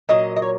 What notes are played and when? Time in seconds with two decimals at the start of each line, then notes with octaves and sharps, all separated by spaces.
0.09 A#2 F#3 D#5
0.36 D#5
0.42 C#5